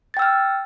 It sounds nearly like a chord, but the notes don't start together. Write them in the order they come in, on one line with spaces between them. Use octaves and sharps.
A6 G5 E6 F6